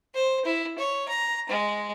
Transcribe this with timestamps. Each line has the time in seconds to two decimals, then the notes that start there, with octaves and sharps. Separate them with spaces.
0.14 C5
0.45 E4
0.78 C#5
1.08 A#5
1.49 G#3